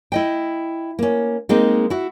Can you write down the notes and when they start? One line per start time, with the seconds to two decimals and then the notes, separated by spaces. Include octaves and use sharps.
0.12 E4 D#5 G5
0.99 A#3 C#4
1.49 G#3 A#3 C4 D#4
1.90 E4 F#4